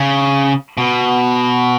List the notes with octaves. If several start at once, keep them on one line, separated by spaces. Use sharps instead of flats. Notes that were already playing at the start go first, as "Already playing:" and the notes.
Already playing: C#3
B2